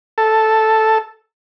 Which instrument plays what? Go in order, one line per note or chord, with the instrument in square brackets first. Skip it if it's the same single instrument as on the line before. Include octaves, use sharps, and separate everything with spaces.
[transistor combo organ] A4